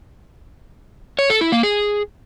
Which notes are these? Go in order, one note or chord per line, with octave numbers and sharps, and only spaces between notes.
C#5
A4
E4
A#3
G#4